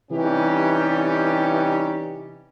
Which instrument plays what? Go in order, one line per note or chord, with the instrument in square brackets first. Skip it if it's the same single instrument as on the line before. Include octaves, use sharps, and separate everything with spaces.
[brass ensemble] C3 E3 G3 C#4 D#4 G4